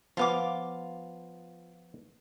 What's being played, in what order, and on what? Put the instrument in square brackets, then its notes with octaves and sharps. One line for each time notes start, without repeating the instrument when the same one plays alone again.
[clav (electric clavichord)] F3 B3 [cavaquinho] F4 F5 D6